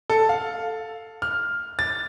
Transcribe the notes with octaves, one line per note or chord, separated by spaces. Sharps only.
A4
F5
F6
A6